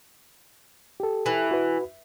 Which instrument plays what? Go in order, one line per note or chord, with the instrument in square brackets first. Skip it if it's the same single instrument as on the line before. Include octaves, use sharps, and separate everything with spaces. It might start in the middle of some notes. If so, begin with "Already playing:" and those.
[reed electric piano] G4 A4
[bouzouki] E3
[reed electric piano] F#4 B4